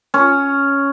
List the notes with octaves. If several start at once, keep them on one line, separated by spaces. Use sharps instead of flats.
C#4